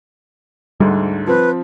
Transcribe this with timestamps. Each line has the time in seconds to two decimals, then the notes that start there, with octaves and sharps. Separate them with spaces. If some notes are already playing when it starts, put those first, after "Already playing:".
0.80 D2 G#2 D3 G3
1.27 F3 C4 B4